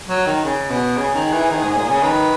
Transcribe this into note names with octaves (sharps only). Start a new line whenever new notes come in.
F#3
D#3
C#3
B2
C#3 G#4
D#3
E3
D#3
G#2
A#2
C#3
D#3 B4